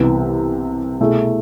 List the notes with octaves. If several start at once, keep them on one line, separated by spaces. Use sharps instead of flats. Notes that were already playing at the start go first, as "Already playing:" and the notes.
Already playing: C2 C3 E3 B3
B2 A3 E4 G#4